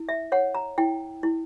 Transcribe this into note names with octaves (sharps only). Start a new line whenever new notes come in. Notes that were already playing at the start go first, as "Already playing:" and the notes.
Already playing: E4
E5
C#5 F#5
A#5
E4 G5
E4